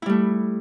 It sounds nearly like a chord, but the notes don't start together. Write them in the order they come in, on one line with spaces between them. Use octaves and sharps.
E4 G3 A3